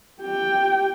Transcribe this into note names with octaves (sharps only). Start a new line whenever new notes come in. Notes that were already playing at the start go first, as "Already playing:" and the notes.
G4 G5